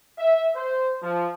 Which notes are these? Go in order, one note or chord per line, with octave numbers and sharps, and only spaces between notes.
E5
C5
F3